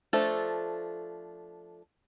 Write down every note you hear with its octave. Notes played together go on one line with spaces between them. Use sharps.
F3 A3 D4 A4